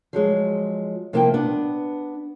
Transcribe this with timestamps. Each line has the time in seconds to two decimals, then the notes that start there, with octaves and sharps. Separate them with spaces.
0.13 F3 F#3 G#3
1.13 C3 F3 A#3 E4 F5 G5
1.34 B3 D4